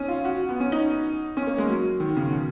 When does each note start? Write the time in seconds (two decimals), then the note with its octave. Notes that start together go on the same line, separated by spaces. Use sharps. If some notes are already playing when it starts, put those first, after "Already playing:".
Already playing: C#4 D#4
0.08 F4
0.25 F#4
0.49 B3
0.60 C#4
0.72 D#4
1.37 C#4
1.47 A#3
1.58 G#3
1.68 F#3
2.00 D#3
2.16 C#3
2.29 B2